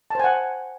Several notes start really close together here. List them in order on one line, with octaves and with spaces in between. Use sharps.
A5 C5 G#5 F#5